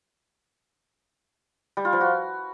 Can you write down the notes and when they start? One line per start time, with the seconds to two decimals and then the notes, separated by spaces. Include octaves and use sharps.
1.77 G3
1.85 F4
1.93 F3
2.01 F#4